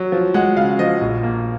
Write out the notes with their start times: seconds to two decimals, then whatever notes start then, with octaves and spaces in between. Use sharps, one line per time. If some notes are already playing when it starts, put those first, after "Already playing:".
Already playing: F#3
0.12 F3
0.34 G#3 F#5
0.57 C#3 F5
0.79 F3 D#5
1.01 A#1
1.23 A#3